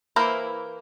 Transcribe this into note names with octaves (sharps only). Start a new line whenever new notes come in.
E3 A#3 E4 A#4 C5